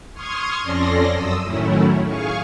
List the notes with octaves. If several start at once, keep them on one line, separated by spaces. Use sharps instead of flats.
C6 C#6 D#6 F6 G#6
F2 C#4 A4 D5 C6 A#6
F#2 D#6 E6
A2 D#3 F#3 A3 C#4 E4
G#4 F5 G#5 C#6